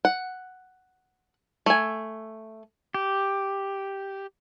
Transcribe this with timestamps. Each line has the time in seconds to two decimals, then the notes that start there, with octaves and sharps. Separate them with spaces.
0.05 F#5
1.66 A3 G#5
2.94 G4